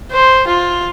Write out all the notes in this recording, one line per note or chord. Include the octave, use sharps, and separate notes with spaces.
C5
F4